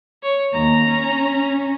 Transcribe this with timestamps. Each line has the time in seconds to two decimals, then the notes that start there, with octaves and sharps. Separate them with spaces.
0.23 C#5
0.53 D#2 A#5
0.87 C#4